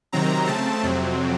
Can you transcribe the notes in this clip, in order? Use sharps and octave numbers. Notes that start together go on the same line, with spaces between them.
C3 D#3 F#3 C4 A#5
C#3 A3 C4 A5
F2 C3 F#3 C4